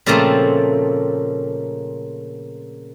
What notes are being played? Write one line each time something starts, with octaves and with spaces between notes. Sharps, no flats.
A#2 C#3 F3 A3 A#3 C4